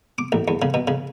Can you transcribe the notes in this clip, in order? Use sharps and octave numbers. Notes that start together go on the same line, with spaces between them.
D6
A1
E2
C#3
B2
C#3